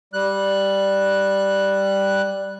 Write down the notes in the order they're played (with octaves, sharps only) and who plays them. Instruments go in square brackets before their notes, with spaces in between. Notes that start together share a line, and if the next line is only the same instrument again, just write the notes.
[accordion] G3 F#6